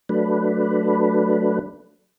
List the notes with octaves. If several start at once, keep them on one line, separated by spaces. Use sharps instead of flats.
F#3 A3 D4 B4